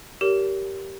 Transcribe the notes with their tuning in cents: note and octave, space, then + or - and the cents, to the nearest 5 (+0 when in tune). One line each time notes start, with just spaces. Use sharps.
G4 -10 A#4 +0 C#5 +35